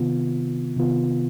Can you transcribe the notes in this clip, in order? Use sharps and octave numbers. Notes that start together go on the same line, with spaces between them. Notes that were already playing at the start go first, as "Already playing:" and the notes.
Already playing: C3 D#3 B3 F4
C3 D#3 B3 F4